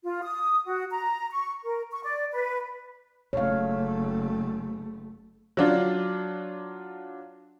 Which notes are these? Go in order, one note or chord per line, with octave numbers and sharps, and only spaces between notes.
F4
D#6
F#4
A#5
C#6
A#4
C#6
D5
B4
F#1 A3 C#5 F5
F#3 D4 F4